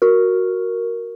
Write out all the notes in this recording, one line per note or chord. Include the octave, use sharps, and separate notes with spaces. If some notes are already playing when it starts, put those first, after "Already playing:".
F#4 A#4